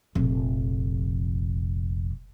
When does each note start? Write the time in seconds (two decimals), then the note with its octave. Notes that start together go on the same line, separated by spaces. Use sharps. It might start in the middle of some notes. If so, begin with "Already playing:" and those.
0.15 F1 A#1